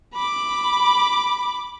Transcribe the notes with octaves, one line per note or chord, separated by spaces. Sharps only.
B5 D6